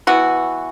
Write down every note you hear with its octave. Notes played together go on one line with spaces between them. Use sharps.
E3 B3 F#4